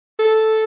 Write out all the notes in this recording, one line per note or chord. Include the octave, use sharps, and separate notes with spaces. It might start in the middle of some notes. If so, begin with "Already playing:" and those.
A4